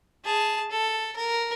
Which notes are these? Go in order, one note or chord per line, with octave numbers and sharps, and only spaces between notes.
G#4 A5
A4
A#4